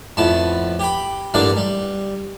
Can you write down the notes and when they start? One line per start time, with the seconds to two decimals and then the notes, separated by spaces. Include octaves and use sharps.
0.17 F2 A2 B3 A5
0.80 G4 G5 B5
1.34 A1 G2 D3 A#3 D4 F5
1.57 G3